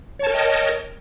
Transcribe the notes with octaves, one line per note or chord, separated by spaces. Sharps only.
A#4 C#5 D#5 G5 A5